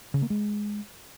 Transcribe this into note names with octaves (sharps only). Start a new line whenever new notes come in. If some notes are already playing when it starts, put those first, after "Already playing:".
C#3
A#3
G#3